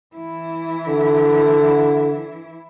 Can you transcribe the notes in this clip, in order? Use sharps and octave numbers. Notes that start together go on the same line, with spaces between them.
E3 E4
D3